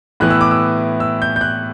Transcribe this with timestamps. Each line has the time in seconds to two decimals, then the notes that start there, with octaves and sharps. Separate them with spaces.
0.20 A2 E3 B3 F#6
0.30 E6
0.41 D6
0.51 E6
1.00 E6
1.22 G6
1.36 G6
1.41 F#6